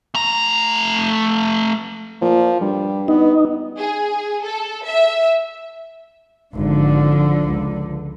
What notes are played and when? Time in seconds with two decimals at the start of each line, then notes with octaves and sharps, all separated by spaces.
0.14 A3 A#5
2.22 A#2 F3
2.61 G2 G3
3.08 B3 D#4
3.78 G#4
4.44 A4
4.85 E5
6.54 G#1 D3 F3
7.44 C#2